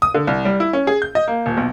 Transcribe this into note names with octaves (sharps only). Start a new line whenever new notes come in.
D#6
D3
C2
G3
E4
C#4
G#4
G6
D#5
A#3
D#1
B1